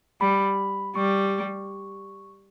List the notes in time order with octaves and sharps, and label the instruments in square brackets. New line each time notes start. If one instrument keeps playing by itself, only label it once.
[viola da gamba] G3 [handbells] B5
[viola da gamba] G3 [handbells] C#6